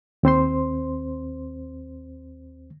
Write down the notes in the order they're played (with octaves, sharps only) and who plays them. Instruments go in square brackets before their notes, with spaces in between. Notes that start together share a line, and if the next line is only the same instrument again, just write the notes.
[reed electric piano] D#2 C4 C5 C6